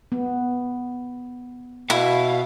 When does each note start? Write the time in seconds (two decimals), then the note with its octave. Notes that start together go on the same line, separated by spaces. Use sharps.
0.12 B3
1.90 B2 E4 F5